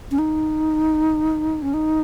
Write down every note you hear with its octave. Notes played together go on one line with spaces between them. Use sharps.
C#4
D#4
C#4
D#4